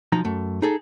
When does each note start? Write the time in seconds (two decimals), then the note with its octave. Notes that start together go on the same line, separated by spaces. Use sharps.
0.12 B1 F3 D#4 A#5
0.25 F#2 A3
0.62 D#4 G#4 A4